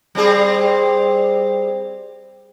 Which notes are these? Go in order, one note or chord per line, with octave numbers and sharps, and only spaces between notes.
G3 C4 G#4